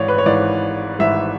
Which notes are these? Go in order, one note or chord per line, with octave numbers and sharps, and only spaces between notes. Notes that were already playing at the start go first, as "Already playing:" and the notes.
Already playing: G#1 G#2 E3 C#5 D5
B4
C#5
G#1 G#2 E3 D5
G#1 G#2 E3 E5